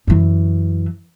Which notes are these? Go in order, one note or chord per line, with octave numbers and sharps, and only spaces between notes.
F#2 E3